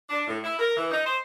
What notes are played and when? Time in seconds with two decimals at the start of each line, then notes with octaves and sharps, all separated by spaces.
0.09 D4
0.27 A2
0.43 E4
0.59 A#4
0.77 E3
0.91 D#4
1.05 C5